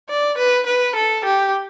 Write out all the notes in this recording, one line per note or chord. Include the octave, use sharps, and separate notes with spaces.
D5
B4
B4
A4
G4